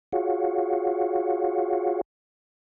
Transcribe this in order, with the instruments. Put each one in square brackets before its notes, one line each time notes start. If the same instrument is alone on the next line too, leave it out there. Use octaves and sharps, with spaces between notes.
[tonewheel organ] F4 F#4 G#4 C#5 F5 F#5